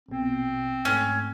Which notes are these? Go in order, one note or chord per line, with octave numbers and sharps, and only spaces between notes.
A#1 B2 C4
G#2 A3 C#4